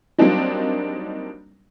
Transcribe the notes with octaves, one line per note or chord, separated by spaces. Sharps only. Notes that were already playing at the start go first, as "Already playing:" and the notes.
F#3 G3 A#3 C4 D4 D#4